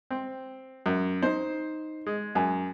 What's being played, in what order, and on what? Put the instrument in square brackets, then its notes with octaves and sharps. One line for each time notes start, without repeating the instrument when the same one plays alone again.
[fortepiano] C4
F#2
[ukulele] D4 D#4 [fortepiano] C5
[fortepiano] G#3
[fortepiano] F#2 [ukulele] G#5